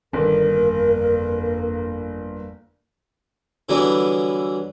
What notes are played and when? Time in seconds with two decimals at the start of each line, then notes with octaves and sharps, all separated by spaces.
0.13 G1 D#3 D4 A#4
0.47 F2 A#3
3.69 D3 E3 F#3 G3 B3 D4